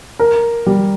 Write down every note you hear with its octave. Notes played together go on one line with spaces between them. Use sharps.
A#4
G3